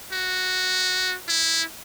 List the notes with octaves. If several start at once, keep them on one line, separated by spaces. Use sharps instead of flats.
F#4
E4